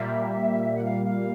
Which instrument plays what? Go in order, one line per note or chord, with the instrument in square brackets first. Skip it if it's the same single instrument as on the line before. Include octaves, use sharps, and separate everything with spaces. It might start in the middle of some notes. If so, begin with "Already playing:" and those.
Already playing: [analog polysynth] A#2 G3 A#3 [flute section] E5
[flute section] F#5
F5
F5